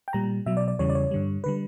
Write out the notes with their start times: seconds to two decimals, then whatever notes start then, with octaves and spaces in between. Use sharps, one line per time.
0.08 G5
0.13 A#2 G3 A#5
0.46 B2 F#3 E5
0.57 D5
0.68 D5
0.79 E2 C#3 E3 G3 C#5
0.90 D5
0.95 C#5
1.11 G2 D3 G3
1.44 D3 G3 B4